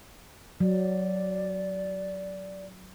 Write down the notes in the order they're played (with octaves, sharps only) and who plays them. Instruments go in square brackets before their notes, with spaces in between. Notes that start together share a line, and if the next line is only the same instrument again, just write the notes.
[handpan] F#3 [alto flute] D5